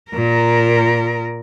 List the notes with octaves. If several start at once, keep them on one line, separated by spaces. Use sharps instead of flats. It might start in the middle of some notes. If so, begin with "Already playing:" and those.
A#2 A#4